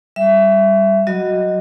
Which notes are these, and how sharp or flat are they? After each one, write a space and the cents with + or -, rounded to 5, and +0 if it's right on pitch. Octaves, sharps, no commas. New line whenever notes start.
G3 +0 E5 +15
F#3 +0 F#4 +0 D#5 +0